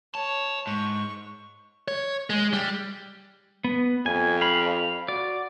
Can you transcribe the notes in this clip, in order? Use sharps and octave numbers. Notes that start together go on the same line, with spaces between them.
C#5 A5
G#2 C#6
C#5
G#3
G3
B3
F2 G#5
F5 B5
F#4 D5